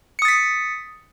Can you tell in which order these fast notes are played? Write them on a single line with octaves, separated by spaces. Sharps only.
C#7 D#6 A6 B6